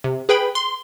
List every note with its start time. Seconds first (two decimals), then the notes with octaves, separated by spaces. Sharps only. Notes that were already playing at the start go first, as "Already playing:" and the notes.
0.04 C3
0.29 G#4 B4 G5 B5
0.55 C6